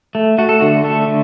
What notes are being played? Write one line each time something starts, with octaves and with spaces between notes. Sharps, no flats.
A3
A3 F#4
A4
D3 F#4
A3 A4
D3